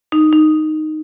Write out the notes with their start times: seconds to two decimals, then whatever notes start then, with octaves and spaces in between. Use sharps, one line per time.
0.12 D#4
0.33 D#4